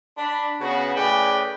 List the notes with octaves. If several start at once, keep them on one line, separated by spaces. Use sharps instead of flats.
D4 B5
C#3 B3 F#4
A2 C#3 G#4 B4 D5 G5